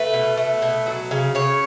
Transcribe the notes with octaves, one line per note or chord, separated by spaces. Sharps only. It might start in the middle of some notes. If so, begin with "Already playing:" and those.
Already playing: A3 B4
B2
A3
B2
F#3
C#3
C#3 C#5